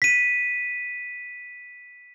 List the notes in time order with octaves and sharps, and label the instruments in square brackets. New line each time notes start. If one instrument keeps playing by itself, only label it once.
[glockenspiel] B6 D#7